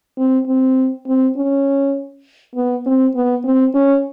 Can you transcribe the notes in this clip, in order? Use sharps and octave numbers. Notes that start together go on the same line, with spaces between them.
C4
C4
C4
C#4
B3
C4
B3
C4
C#4